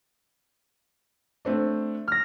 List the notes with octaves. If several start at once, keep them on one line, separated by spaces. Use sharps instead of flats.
A3 C4 D4
F6 A#6